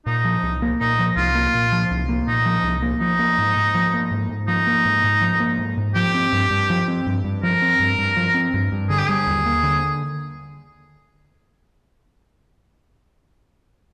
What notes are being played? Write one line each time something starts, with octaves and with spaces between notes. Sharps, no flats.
A#2 D#4
F3
C2
A#3
A#2 D#4
F3
C2 F4
A#3
A#2
F3
C2
A#3
A#2 D#4
F3
C2
A#3
F3 D#4
A#3
G#2
G#2
F3
A#3
G#2
G#2
F3 D#4
A#3
G#2
G#2
F3
A#3
G#2
G#2
F3 G4
C4
G2
G2
F3
C4
G2
G2
F3 A#4
C4
G2
G2
F3
C4
G2
G2
D3 G#4
G4
G3 G#4
D#2
A#3
D3